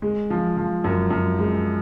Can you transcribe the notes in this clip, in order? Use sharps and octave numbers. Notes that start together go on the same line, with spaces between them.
G#3
F3
F3
F#2
F#2
G#3